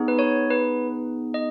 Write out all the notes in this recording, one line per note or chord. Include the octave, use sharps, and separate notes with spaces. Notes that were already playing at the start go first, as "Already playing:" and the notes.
Already playing: B3 D#4 G#4
B4
C#5
B4
D#5